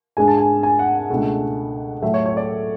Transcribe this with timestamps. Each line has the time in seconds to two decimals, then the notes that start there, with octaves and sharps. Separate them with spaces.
0.17 G#2 G#3 D4 G#5
0.28 A5
0.38 G#5
0.63 G#5
0.79 F#5
0.95 F#5
1.10 C#2 B2 A3 D4
2.02 A2 F#3 A3 E5
2.14 C#5
2.26 C#5
2.37 D5